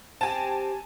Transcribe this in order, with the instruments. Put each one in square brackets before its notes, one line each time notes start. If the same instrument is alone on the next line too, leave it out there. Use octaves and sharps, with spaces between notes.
[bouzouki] C4 G4 [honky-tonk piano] G#5 A5